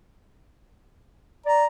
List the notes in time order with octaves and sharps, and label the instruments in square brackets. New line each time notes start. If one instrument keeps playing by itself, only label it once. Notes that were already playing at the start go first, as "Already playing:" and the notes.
[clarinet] D5 [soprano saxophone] A#5